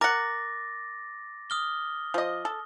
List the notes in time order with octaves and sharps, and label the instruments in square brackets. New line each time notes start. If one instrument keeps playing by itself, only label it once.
[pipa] A#4 F#5 [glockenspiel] D6 A6 A#6
[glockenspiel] D#6 F6 G7
[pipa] F3 D#5
A4